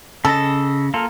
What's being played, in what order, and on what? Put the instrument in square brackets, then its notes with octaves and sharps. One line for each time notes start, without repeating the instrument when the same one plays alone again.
[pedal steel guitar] C#3 D#5 [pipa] A4
[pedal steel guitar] A#3 F4 A4